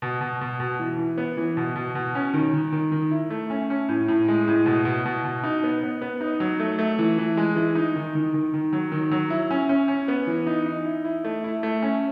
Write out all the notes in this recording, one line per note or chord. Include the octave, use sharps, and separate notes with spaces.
B2
B2
B2
B2
E3
E3
B3
E3
B2
B2
B2
C#4
D#3
D#3
D#3
D#3
E4
A3
C#4
C#4
A2
A2
G#3
A2
B2
B2
B2
B2
D#4
B3
B3
B3
D#4
F#3
A3
A3
E3
E3
G#3
E3
D#4
D#3
D#3
D#3
D#3
F#3
D#3
F#3
E4
C#4
C#4
C#4
B3
E3
D#4
D#4
E4
E4
A3
E4
A3
C#4